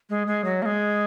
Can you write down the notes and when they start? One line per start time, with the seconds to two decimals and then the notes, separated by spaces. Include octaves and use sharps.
0.10 G#3
0.27 G#3
0.44 F#3
0.62 A#3
0.66 G#3